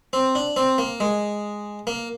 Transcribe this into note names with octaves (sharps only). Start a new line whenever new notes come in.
C4
D4
C4
A#3
G#3
A#3